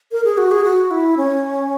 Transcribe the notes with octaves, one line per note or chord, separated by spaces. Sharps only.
A#4
G#4
F#4
G#4
F#4
E4
C#4